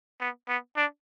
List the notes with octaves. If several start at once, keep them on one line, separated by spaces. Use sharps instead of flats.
B3
B3
D4